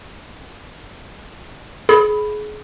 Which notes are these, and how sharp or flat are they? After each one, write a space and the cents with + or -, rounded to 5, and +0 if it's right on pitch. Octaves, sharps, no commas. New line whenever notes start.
G#4 +30 B5 +0